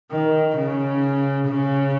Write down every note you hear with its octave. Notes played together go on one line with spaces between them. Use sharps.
D#3
C#3
C#3